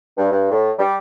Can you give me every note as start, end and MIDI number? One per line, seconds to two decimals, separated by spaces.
0.17 0.27 43
0.31 0.50 43
0.51 0.71 45
0.79 0.95 55